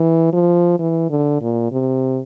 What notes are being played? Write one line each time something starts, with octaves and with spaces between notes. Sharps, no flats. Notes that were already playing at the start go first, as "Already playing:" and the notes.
Already playing: E3
F3
E3
D3
A#2
C3